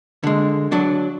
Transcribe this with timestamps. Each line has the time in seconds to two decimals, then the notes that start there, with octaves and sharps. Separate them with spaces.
0.23 D3 G#3
0.72 F#3 D4